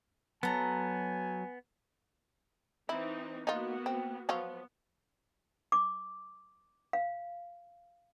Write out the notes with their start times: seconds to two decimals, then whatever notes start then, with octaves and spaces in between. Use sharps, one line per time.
0.43 F#3 B3 A4 G#5 A#5
2.89 E3 C4 D#4 E4
3.47 A#3 B3 D#4 F4 F#4
3.86 C4
4.29 F3 F#3 B3 F4
5.72 D6
6.93 F5